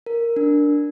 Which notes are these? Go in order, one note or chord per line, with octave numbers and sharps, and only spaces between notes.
A#4
D4